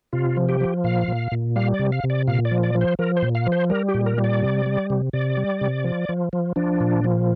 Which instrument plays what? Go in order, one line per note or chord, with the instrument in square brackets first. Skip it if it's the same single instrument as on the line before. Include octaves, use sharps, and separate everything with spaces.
[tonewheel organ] C3 F4
F3
G4
F3
A#2 F5
A#2
A#2
G3 F5
D5
C3
F5
C3
D5
A#2 F5
D5
F3
D5
F3
C5
F3 A#4
C5
A#2
F5
F3
C5
G3 A#4
G4
A#2
A#4
G3
D5
C3
G3
C3
C3 D5
G3
C3
F3
F3
F3
F3 D4
A#2
F3